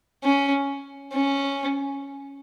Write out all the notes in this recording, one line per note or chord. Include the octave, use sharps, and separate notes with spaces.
C#4
C#4